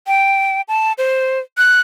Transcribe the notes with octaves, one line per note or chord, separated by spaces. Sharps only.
G5
A5
C5
F#6